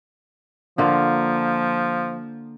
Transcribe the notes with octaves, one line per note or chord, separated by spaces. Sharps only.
D3 F3 A#3 F4